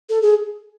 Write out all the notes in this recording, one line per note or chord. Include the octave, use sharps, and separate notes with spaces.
A4
G#4